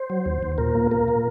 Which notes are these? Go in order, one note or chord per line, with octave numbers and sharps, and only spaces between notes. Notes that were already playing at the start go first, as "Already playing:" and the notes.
Already playing: C5
F#3
D#2
D#2
A#2 A#4
A#3
A#3 A#4
A#2